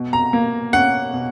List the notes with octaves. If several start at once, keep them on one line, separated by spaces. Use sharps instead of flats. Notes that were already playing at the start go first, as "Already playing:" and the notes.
Already playing: B2
A#5
A#3
C#4 F#5
B2